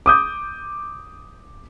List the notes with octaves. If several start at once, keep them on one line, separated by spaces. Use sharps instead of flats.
D6 D#6 G6